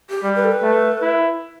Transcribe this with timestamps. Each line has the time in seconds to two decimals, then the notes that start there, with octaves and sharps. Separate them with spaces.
0.10 G4
0.23 G3
0.36 B4
0.44 A4
0.52 B4
0.63 A3
1.02 E4